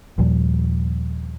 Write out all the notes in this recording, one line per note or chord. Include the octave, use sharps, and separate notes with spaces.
D#2 A#2 F3 G3